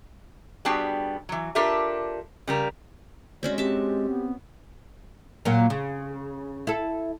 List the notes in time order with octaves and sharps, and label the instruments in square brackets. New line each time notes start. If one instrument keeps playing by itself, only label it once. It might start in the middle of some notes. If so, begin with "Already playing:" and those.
[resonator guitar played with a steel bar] G3 B3 D4 F#4 G#4 G5
E3 F#3
D4 F4 G4 A4 A#4 E5
C#3 G3 A#4
[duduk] G#3 [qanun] C4 C#4 F#4 [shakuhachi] D5
[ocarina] C4 [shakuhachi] G4 [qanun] E5 A5
[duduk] B3
[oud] A#2 F#3 A#3
C#3
E4 A4